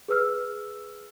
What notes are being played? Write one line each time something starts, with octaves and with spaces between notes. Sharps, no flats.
G#4 B4 E6 F6